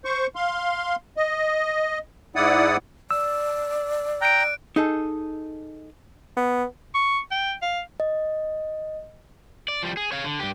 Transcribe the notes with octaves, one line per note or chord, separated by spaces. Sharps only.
C5 C#6
F5 C6
D#5
G#2 E4 D5 F#5 D#6
D5 E6
G5 A#5 F#6 D7
D#4 G#4 A4
B3
C#6
G5
F5
D#5
D5
F3 G3
G#4
C#5 F5
D3
G2 G4